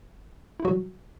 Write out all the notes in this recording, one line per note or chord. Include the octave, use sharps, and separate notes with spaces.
E4
C3 E3 F#3 G3 F#4